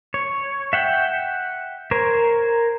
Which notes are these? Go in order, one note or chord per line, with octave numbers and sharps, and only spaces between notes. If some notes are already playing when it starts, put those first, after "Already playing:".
C#5
E5 F#5 G5
A#4 C5 C#5